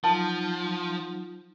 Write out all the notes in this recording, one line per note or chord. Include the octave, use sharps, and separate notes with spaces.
F3 F#3 D#4 F4 A5